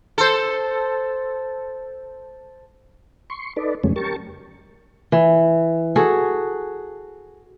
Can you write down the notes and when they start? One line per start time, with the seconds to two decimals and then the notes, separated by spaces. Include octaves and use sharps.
0.18 A4 C5
3.30 C6 C#6
3.56 D#4 A4 B4 D5
3.84 F2 C#3 F#3 G#3 A3 C#4
3.96 G4 A#4 A5 C#6
5.12 E3
5.96 F#4 G#4 A4